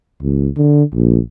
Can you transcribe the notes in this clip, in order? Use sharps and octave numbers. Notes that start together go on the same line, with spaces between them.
C#2
D3
A#1